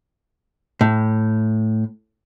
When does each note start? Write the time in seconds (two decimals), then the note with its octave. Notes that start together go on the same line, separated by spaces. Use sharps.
0.81 A2